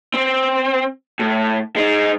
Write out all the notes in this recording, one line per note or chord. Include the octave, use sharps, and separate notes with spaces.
C4
A2
G#3 D#4